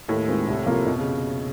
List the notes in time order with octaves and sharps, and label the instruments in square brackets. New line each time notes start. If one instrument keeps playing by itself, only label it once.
[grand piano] D#2 [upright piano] A2
[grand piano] D#3 G#3 C4 F4
C2
C3 F3 A#3
[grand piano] F2 [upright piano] B2
[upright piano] C#3